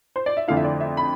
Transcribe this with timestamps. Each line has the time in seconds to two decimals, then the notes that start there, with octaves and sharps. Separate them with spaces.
0.16 C5
0.26 D5
0.37 E5
0.48 F2 D3 A3 E4 F5
0.57 E5
0.64 D5
0.80 E5
0.97 B5